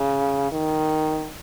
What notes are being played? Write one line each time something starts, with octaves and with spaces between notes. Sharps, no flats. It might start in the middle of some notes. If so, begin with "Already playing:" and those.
Already playing: C#3
D#3